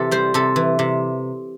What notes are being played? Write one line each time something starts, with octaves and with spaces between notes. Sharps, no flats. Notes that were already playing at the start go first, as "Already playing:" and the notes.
Already playing: C3 E3 G4 A4
G3 C5
C3 A4
E3
C3